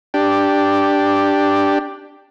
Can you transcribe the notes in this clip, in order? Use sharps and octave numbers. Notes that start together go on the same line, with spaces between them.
D4 G4